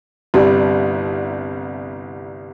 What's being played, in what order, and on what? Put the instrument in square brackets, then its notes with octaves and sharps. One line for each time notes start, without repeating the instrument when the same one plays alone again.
[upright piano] G1 C2 G3